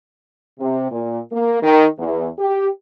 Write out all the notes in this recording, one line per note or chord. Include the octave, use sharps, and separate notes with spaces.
C3
A#2
A#3
D#3
E2
G4